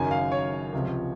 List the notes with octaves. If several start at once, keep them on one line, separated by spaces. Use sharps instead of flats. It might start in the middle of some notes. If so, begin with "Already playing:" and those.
Already playing: F#1 F#2 D#3 F#3 G#5
F5
C#5
C#2 C3 F3